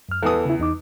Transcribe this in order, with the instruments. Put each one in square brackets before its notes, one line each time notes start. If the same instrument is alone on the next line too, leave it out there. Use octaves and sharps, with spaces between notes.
[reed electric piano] F#2 F6
[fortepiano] E2 E3 D#6 [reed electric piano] A4 A5
[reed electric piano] C#3 E4
E2 D#4 D6